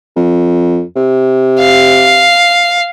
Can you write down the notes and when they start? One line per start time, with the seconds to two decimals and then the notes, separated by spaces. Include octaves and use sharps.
0.16 F2
0.96 C3
1.59 F5